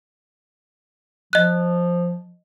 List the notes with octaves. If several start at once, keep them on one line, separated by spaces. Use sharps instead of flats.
F3 D#5 F#6